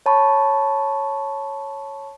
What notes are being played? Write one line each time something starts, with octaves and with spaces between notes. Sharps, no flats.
C#5 A5 B5 C#6